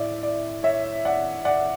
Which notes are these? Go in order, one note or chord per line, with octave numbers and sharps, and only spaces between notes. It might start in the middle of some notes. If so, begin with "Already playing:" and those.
Already playing: A2 E4 D5 E5
D5
C#5 E5
D5 F#5
D5 F#5